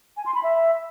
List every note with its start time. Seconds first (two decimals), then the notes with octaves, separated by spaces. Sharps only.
0.17 G#5
0.26 C6
0.35 B5
0.43 E5